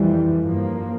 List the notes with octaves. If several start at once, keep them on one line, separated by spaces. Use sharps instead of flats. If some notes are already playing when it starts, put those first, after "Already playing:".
Already playing: F2 E3 G3
G2 F3 A#3